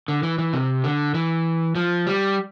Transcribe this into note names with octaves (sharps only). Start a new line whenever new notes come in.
D3
E3
E3
C3
D3
E3
F3
G3